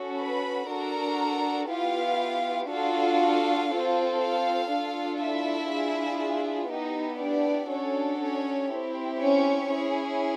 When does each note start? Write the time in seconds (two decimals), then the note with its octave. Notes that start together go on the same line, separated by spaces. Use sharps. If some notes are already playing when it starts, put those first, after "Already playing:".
Already playing: C#4 F#4 A4
0.19 B4 B5
0.69 D4 F#4 A4 A#4 A#5
1.69 B3 E4 F4 G4 F5
2.69 D4 F4 F#4 A4 F5
3.70 C4 F4 A4
4.19 F4 F5
4.70 D4 F4 A4
5.19 E4 E5
5.70 D4 F4 G#4
6.69 B3 D#4 E4 G4 D#5
7.19 D4 D5
7.69 C#4 D4 F#4 A4 C#5
8.20 C#4 C#5
8.70 C4 E4 G4
9.20 C#4 C#5
9.70 C#4 E4 G#4